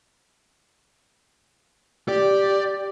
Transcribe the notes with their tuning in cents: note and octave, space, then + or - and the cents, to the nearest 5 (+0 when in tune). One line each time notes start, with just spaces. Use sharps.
G4 +0 D5 +0